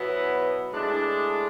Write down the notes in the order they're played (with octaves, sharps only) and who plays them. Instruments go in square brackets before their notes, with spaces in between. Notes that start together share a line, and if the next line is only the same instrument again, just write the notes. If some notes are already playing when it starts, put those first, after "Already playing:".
Already playing: [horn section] B2 F#3 B3 E4
A2 G#3 D4